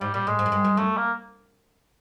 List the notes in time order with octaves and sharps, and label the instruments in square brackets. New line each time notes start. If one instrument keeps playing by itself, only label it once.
[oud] G#2 [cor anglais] G3
[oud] A#2 [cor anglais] G3
[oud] A2 [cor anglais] G#3
[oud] G#2
F#2
G2
F#2
[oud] F#2 [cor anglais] A3
[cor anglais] A#3